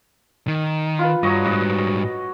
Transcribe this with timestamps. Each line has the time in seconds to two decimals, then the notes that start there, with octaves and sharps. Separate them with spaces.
0.47 D#3
0.99 F4 B4
1.23 G2 F#3 C#5 D#5
1.44 G#2 G3 F#4 D#5